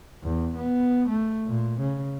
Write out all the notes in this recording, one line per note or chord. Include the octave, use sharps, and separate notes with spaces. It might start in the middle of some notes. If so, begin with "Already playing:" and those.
E2
B3
A3
A#2
C#3